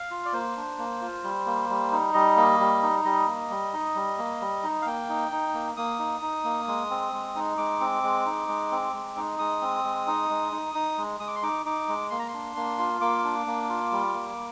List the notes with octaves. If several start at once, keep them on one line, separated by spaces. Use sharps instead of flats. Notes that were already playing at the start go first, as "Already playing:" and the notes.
Already playing: F5
F4
D5
A#3 C5
D4
A#3
F4
G3
A#3
G3
D#4
G3 D#5
A#3
G3
D#4
G3 D#5
A#3
G3
D#4
G3
A#3
G3
D#4
F5
A#3 G5
D#4
D#4
A#3
A#3 D#6
D#4
D#4
A#3
G#3
C4
G#3
D#4
G#3 D6
C4
G#3
D#4
G#3
C4
G#3
D#4
G#3 D#6
C4
G#3
D#4
G#3
D#4
D#4
G#3
G#3 D#6
D6
C6
D#4 D6
D#4 D6
G#3
A#3 C6
A#5
C6
D4
A#3
F4
A#3 D6
D4
A#3
F4
G3
A#3